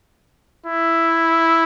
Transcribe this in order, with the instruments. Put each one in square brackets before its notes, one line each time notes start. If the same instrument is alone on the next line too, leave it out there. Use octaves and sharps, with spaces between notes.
[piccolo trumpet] E4